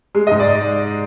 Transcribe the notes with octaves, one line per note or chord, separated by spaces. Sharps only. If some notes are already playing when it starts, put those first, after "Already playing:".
G#3
D#5
G#2
D5